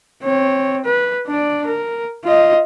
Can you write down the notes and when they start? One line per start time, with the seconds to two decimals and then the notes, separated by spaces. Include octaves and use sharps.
0.24 C4 C#5
0.85 B4
1.27 D4 D5
1.67 A#4
2.24 F4 D#5